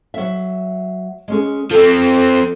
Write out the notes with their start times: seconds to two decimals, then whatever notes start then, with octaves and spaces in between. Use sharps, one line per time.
0.14 F#3 E5
1.28 G#3 C#4 G#4
1.71 F3 C4 A4